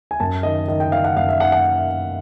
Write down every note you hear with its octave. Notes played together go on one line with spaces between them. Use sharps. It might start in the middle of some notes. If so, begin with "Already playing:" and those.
G#5
F#2 A5
D#3 D#5
D#3 D#5
G5
D#3 F5
F#5
F#2 F5
E5
D#3 F#5
F#5